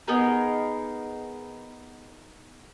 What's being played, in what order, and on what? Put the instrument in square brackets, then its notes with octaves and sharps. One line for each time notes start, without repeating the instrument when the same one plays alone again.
[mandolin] B3 D#4 G#4 A#4